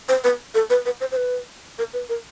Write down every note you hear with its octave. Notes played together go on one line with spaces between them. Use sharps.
C5
B4
A4
B4
B4
C5
C5
B4
A#4
B4
A#4